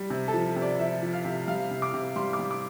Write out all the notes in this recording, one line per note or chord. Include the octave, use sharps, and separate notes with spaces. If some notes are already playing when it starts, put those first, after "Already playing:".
Already playing: G3
C3
A4
F3
C3
D5
F3 E5
F3
F5
C3
G3 F5
C3
D6
C3
G3 C6
D6
G3
D6